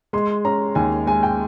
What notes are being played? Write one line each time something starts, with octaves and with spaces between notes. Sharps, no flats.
G#3 C6
C#4 A#5
D#2 G#5
G#3 G#5
G5